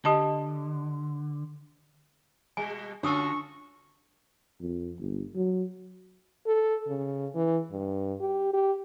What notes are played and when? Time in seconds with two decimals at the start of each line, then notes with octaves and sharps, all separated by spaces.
0.05 D3 G4 D#5 A5
2.57 B2 G3 G#5
3.03 D3 C#4 D4 F4 F#4 C#6 D#6 E6
4.60 F2
4.99 G1
5.35 F#3
6.46 A4
6.88 C#3
7.35 E3
7.71 G2
8.20 G4
8.53 G4